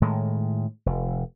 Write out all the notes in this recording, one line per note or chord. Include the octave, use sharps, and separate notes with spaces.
A2 D#3 G#3
F1